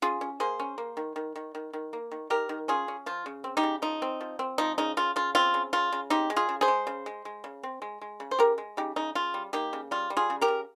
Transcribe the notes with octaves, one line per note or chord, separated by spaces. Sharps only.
C#4 F4 G#4
C#4
A#3 G#4 C5
C#4
A#3
D#3
D#3
D#3
D#3
D#3
A#3
D#3
D#3 G4 A#4
D#3
C#4 F4 G#4
C#4
F3 F4
C#3
C4
D#4 G4
C#3
F3 D#4
C4
F3
C4
F3 D#4
C#3 D#4
C#3 F4
C#3 F4
C4 F4
C#3
C#3 F4
C#3
C4 D#4 G4
G#3
F4 G#4
C#3
G#4 C5
G#3
C#3
G#3
G#3
C#3
C4
G#3
G#3
C#3
C5
C#3 G4 A#4
G#3
C#3 D#4 G4
C#3 D#4
C#3 F4
G3
A#3 D#4 G4
C#3
G3 F4
G3
F4 G#4
C#3
G4 A#4
C#3